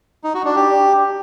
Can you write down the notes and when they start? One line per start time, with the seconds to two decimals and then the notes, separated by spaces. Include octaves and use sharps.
0.24 D#4
0.35 F#4
0.45 D4
0.56 G4